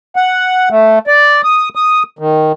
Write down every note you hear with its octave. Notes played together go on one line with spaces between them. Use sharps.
F#5
A3
D5
D#6
D#6
D#3